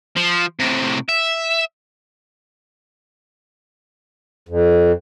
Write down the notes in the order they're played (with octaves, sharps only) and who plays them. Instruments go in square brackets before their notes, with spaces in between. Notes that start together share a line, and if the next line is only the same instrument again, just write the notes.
[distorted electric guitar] F3
A2 C3
E5
[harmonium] F2